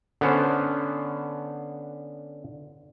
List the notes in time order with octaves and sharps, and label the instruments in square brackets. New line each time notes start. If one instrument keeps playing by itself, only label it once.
[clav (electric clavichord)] D3 B3 C#4 C5